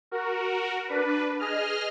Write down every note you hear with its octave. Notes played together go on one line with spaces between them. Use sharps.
F#4 A#4
D4 B4
G#4 D#5 F6